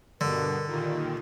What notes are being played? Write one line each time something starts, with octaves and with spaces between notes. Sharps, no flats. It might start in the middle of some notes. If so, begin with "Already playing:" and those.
G2 B2 D3 A#4
A#2 D#3 G3 D#4 F4